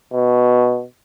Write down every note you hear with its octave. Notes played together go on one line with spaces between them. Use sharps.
B2